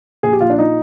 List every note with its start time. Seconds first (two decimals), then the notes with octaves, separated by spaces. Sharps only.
0.23 A#1 G#4
0.33 G4
0.40 A#1 F4
0.50 D4
0.59 F3 D#4